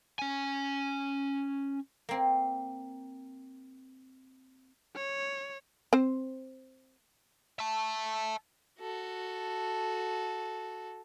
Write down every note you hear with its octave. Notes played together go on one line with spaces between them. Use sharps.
C#4 G#5
A#3 C4
C#5
C4 C5
E5 A5
F#4 A4